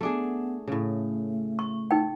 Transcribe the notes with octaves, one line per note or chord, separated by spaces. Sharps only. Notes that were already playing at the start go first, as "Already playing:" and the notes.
A3 B3 D4 G#4
A2 C#3 A3
C#6
D#4 G5